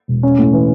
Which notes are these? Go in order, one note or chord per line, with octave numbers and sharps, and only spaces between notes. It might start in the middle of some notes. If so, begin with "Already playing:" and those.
E1
C#4
A2
E3